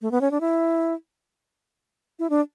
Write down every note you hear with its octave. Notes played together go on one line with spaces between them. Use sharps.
A3
B3
C#4
D4
E4
E4
D4